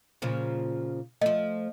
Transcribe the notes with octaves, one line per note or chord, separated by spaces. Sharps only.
A#2 C#3 F3
F3 A3 D#5